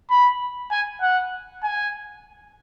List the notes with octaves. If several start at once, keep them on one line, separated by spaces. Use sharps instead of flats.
B5
G#5
F#5
G#5